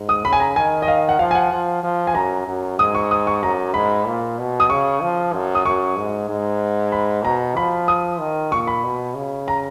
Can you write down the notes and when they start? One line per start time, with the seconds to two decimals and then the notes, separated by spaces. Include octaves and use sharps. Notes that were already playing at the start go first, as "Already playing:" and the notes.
Already playing: G#2
0.09 D#6
0.25 C#3 B5
0.33 G#5
0.40 A#5
0.56 D#3 G#5
0.82 D#5
0.88 F5
1.09 F#5
1.19 F3 F5
1.31 G#5
1.35 F#5
1.52 F3
1.84 F3
2.07 G#5
2.15 F#2 A#5
2.47 F#2
2.79 G#2 D#6
2.95 C#6
3.11 D#6
3.27 C#6
3.43 F#2 A#5
3.74 G#2 B5
4.06 A#2
4.38 B2
4.60 D#6
4.70 C#3 C#6
5.02 F3
5.33 F#2
5.55 D#6
5.66 F#2 C#6
5.97 G#2
6.29 G#2
6.92 B5
7.24 B2 A#5
7.56 F3 B5
7.88 D#6
8.20 D#3
8.52 A#2 C#6
8.67 B5
8.84 B2
9.15 C#3
9.48 A#5